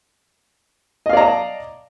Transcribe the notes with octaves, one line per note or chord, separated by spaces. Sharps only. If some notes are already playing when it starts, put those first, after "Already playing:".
D5 D#5 F5 A5 A#5